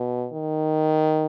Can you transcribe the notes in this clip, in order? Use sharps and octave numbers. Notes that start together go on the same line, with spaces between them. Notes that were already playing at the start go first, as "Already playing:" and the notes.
Already playing: B2
D#3